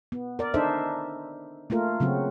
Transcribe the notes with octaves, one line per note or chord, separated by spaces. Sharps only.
B3
A#4 D5
D4 D#4 A4 C5 E5
A3 A#3 F4 A#4
C#3 F#3 C4 F#4